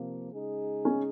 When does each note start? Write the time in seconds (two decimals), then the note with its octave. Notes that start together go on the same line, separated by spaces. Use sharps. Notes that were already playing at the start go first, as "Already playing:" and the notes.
Already playing: C3 F3 A#3
0.32 C#3 G#3 D#4 G#4
0.85 C#4